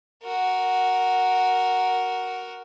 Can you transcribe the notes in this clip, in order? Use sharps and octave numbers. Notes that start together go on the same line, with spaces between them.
F#4 A#4